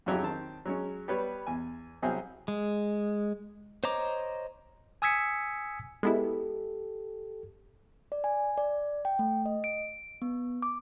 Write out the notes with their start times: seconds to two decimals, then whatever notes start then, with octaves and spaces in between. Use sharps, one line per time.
0.06 F2 C3 F#3 G#3 E4 G4
0.23 D#3 C4 A5
0.66 F#3 G#3 C#4
1.08 G3 B3 B4 C#5
1.47 E2 G#5
2.02 C2 F#3 G#4 C5 E5
2.48 G#3
3.84 C5 C#5 D#5 A#5 D6
5.02 G#5 D#6 E6 G#6 B6 C#7
6.03 G#3 B3 E4 G4 A4
8.12 D5
8.24 G#5
8.58 D5
9.05 G5
9.19 A3
9.46 D#5
9.64 D7
10.22 B3
10.62 D6